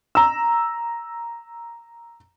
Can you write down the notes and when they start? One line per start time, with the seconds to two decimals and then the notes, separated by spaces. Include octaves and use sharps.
0.15 A#5 E6